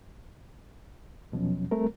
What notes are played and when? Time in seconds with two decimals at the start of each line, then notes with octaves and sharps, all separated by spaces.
1.32 E2 B2 F3 F#3 C#4
1.71 G3 A3 C4 A#4